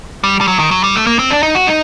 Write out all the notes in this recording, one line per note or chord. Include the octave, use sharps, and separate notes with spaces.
G3
G3
F#3
D#3
F#3
G3
A3
A#3
C4
D4
D#4
F#4
D#4